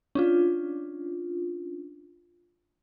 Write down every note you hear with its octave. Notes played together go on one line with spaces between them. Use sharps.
C#4 D4 F4